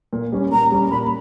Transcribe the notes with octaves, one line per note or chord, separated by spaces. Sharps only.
A#2
G3 C#4
A#2 A#5
G3 C#4
A#2 B5